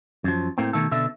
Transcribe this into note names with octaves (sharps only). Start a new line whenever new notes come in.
F#2 F3
A2 A#3 C4
B2 D#3 A3 A4
B2 D3 E5